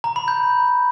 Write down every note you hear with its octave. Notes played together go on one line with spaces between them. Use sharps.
A#5
B5
G6